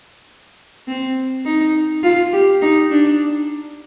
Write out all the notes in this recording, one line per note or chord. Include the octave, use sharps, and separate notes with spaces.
C4
D#4
F4
G4
D#4
D4